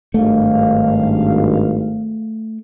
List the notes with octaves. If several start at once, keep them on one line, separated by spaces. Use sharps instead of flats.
G#1 G2 A3 F5